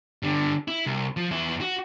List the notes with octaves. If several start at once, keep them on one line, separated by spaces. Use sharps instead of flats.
G2 D3
E4
C2
F3
E2 E4
F#4